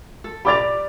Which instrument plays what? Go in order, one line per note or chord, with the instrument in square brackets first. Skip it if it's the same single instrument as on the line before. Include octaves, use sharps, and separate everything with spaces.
[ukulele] A4
[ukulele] G4 D5 A#5 [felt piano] B5 D6 A6